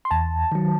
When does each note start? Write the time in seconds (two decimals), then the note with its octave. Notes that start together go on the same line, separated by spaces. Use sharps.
0.05 C6
0.11 E2 A5
0.52 D#3 F#3